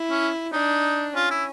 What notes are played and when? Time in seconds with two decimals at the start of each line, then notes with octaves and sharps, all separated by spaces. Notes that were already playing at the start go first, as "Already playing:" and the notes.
Already playing: E4
0.11 C#4
0.53 D4 D#4
1.15 C#4 F4
1.31 E4